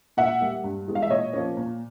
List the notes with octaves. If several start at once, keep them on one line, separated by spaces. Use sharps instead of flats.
A#2 E5 F#5
G3 A#3
G2
E3 G#3 B3
F5
E5
A#2 C#5 D#5
F3 A#3 C#4
A#2